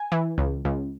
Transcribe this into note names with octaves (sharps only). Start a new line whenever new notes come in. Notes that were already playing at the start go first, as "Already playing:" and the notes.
Already playing: G#5
E3
C#2
C#2